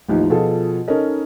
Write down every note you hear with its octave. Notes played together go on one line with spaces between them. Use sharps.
A1 D#2 F3 D#4
B2 F3 F4 G#4 A4
C#4 D#4 A4 A#4 D#5